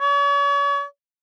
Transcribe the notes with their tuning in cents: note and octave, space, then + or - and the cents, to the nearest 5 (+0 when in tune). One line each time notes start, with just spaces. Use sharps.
C#5 +40